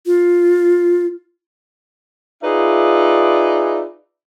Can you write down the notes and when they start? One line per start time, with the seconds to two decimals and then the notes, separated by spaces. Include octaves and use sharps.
0.06 F4
2.43 D#4 F4 G#4 B4 D5 E5